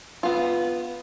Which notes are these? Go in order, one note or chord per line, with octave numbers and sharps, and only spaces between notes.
B3 F4